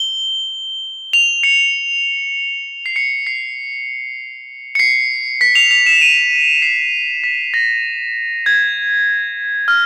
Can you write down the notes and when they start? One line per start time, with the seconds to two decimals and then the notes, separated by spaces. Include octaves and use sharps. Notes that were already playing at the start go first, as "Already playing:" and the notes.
Already playing: G7
1.13 F7
1.43 C#7
2.86 C7
2.96 C#7
3.27 C7
4.75 C#7
4.79 C7
5.41 B6
5.55 F7
5.71 F7
5.86 E7
6.01 D#7
6.62 C7
7.24 B6
7.54 A#6
8.46 G#6
9.68 F6